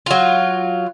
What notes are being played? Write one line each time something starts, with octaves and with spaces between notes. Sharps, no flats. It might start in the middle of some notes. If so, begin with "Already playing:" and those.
F#3 F4